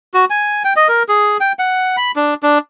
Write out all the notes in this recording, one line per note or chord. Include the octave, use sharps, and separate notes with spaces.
F#4
G#5
G5
D#5
A#4
G#4
G5
F#5
B5
D4
D4